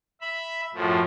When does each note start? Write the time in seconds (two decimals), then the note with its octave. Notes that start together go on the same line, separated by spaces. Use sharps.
0.21 E5 B5
0.74 F#2 A2 F3